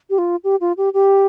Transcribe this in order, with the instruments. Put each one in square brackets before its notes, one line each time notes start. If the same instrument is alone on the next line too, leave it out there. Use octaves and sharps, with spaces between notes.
[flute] G4
F4
G4
F4
G4
G4